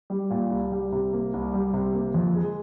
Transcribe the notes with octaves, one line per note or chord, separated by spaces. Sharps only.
G3
A#2
C2
G3
C3
A#3
C2
G3
C3
A#3
F2
G#3